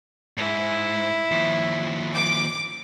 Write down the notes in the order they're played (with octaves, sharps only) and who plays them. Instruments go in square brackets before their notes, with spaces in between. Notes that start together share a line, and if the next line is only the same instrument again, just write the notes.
[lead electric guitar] G#2 [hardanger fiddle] E4
[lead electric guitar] D#2 F3
[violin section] D6